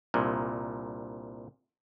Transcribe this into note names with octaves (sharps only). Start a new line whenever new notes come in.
C2 G2 A#2